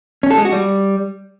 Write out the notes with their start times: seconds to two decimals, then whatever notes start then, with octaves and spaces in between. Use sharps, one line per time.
0.23 C#4
0.31 A4
0.38 G#3
0.45 F#4
0.52 G3